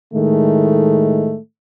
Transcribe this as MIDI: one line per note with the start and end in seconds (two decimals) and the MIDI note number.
0.14 1.37 45
0.14 1.37 51
0.14 1.37 56
0.14 1.37 57